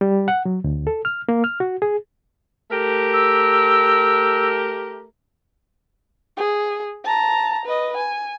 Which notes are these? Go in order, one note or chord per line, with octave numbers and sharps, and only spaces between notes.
G3
F#5
F#3
D2
A4
F6
A#3
F6
F#4
G#4
A3 G4 A#4
E6
G#4
A5 A#5
B4 D#5
G#5